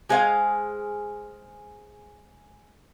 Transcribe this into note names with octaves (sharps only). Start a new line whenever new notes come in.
G#3 G#4 C5 D5 F5